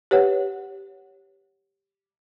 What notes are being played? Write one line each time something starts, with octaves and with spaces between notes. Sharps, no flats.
G4 B4 C#5 F#5